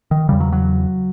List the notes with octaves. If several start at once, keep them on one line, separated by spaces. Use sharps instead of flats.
D#3
E2 C#3 G3
F#3
F#3